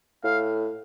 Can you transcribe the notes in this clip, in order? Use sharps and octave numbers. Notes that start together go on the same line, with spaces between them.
A2 F5